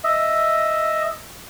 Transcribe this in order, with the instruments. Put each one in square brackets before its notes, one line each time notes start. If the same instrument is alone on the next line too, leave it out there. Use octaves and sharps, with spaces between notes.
[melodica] D#5 E5